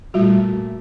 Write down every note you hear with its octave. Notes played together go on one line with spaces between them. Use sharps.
A#2 G3 A3 F4 F#4